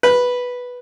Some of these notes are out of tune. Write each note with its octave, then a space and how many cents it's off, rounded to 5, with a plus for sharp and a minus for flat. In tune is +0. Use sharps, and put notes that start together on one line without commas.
B4 -5